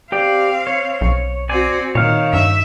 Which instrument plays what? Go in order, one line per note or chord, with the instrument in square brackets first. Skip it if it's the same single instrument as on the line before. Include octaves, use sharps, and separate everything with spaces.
[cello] C4 F5 [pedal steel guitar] G4 D5
[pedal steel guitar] C#5
[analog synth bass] B1
[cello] C4 F#4 [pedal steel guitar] D5 G#5
[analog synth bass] A#2 [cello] D#3 [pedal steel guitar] C#5 F5
[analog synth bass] G2 [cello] E5